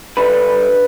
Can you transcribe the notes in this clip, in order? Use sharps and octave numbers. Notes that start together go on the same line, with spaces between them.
D3 G3 B4